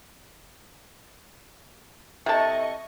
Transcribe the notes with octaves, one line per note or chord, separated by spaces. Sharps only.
C3 E4 A4 D#5 E5 A5 C#6